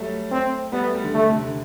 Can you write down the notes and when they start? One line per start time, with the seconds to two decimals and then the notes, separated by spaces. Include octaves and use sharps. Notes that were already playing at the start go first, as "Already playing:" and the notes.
Already playing: F#3 G3 A3
0.31 C4
0.72 G3 B3
0.84 A3
0.94 G3
1.04 D3
1.14 D3 A3
1.29 C3
1.42 D3